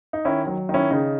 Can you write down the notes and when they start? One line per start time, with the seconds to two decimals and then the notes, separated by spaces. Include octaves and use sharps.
0.13 D#4
0.25 D#3 C#4 E4
0.47 F#3
0.69 D#3
0.74 C#4 E4
0.90 C#3 D#4